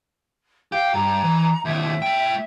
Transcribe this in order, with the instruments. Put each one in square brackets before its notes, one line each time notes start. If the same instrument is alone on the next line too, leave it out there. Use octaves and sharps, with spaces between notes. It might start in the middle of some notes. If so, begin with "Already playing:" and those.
[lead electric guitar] G4 [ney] F5
[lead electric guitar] G2 [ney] A#5
[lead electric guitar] E3
[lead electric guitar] D#2 A2 [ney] E5
[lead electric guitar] A3 G5